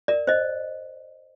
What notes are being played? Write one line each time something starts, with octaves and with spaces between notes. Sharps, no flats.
A#4 D5
C5 D#5